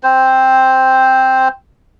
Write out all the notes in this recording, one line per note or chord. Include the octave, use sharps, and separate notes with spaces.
C4 C5